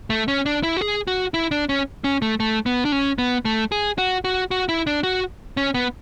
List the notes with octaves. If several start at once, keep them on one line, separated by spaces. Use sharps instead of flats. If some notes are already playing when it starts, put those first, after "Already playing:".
A3
C#4
D4
E4
F#4
G#4
F#4
E4
D4
C#4
C#4
A3
A3
B3
D4
C#4
B3
A3
G#4
F#4
F#4
F#4
E4
D4
F#4
C#4
B3